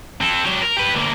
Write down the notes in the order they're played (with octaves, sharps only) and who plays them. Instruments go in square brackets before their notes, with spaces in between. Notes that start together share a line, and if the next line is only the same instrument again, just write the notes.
[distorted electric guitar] C4 A4
F#3 G4
A#4
G4 B4
D2 A#3